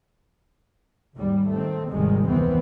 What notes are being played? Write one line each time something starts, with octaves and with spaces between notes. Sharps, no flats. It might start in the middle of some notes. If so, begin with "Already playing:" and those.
G#1 D#2 G3
D#3 A3 C4
G#1 D#2 C3 D#3 G3 G#3
F1 D2 D#3 E3 B3 C4